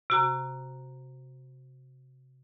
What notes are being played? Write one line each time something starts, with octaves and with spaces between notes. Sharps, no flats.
C3 F#4 A#5